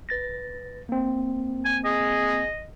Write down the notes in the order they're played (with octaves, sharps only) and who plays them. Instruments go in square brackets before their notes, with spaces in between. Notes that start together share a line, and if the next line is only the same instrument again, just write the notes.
[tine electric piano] B4 A6 A#6
A#3 C4
[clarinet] G#5
[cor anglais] G#4 [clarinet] D#5